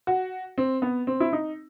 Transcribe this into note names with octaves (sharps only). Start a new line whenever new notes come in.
F#4
C4
B3
C4
E4
D#4